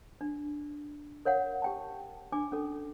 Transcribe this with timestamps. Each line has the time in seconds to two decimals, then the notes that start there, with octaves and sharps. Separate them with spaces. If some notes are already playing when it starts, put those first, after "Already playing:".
0.21 D4
1.25 A#4 C#5 F5 F#5
1.62 G4 G5 A5
2.32 D4 G#5 D6
2.52 C#4 A4